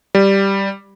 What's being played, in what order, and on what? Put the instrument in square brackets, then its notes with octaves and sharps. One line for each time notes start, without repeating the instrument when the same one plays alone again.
[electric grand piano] G3